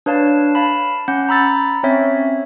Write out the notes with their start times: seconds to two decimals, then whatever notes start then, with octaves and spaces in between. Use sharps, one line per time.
0.06 D4 B4 C#5 F5 A5
0.55 F5 A5 B5
1.08 C#4 F#5 G6
1.29 A#5 B5 E6 A6
1.83 C4 C#4 C#5 E5